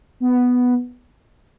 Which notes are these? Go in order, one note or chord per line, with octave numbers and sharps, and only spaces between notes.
B3